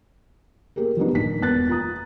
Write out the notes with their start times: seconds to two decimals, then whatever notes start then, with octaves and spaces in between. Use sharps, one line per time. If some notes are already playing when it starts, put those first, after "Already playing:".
0.76 A#3 G4 G#4 A#4
0.97 F3 F#3 G#3 B3 D4 D#4
1.13 D#1 A#3 B6
1.40 E1 A#3 B3 F#6 A6
1.69 F4 A#5 D#6